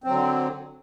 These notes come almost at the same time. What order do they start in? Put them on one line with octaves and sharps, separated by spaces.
C4 F#3 D3